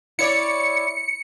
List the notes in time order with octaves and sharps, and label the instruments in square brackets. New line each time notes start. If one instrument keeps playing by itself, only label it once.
[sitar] E4 C#5 D5 [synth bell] C#7